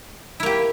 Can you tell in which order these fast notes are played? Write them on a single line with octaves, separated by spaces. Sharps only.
E4 A#3 G4